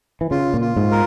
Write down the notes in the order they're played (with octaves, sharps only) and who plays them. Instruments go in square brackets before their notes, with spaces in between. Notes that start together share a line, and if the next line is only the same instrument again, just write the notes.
[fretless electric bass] E3
[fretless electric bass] C#3 [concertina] F4
[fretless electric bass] A#2
[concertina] F4
[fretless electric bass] G#2
[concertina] A#4